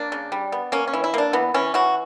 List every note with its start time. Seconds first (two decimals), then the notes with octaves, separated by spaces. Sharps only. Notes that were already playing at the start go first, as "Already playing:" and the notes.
Already playing: A#3 D4
0.12 C#3
0.32 G3
0.52 B3
0.72 A#3 C#4
0.87 C#4
0.93 E3
1.04 E4
1.14 A#3 D4
1.33 E3 B3
1.54 E3 C#4
1.74 E3 F#4